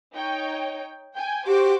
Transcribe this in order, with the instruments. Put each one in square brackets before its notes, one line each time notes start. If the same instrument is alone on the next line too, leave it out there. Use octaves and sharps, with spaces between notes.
[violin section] D#4 C#5 G5
G5 G#5
[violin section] F#4 C5 D6 [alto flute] G4